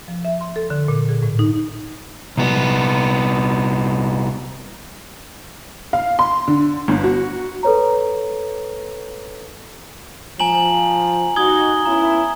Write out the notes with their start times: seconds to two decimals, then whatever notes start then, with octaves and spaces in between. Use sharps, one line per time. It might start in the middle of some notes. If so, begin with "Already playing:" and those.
0.08 F3
0.25 E5
0.41 C6
0.56 A4
0.70 D3
0.88 A#2
1.09 G#4
1.23 A2
1.39 D#4
2.37 C2 B3
5.93 F5
6.19 C6
6.48 D3
6.88 G1
7.04 F#4
7.63 A4 B4 C#5 A#5
10.40 F3 G#5 A#5 F#7
11.36 D#4 F#4 D#6 G#6 G7
11.86 B3 C#4 E4 A#5